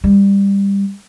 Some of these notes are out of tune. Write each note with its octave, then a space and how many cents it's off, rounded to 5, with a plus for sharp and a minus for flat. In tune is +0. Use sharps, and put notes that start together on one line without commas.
G3 +20